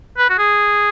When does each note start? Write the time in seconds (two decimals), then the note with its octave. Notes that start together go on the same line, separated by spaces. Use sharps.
0.18 B4
0.30 F#4
0.38 G#4